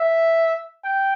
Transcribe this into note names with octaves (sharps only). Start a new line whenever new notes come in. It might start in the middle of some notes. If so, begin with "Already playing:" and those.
Already playing: E5
G5